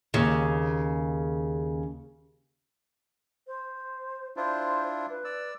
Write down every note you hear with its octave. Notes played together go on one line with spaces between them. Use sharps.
D#2 C#3
C5
D4 E4 F4 C5
B4
D5 E6